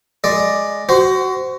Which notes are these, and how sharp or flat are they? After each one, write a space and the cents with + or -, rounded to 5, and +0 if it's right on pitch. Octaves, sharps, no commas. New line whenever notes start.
G#3 +0 D5 +10
F#4 +20 C5 -15